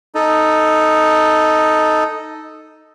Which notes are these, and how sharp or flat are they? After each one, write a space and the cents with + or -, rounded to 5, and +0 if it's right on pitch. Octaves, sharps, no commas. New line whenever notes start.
D#4 +0 A4 +0